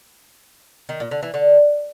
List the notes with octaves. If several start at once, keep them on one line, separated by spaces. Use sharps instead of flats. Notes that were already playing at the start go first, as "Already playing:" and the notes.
D#3
A#2
D3
E3
D3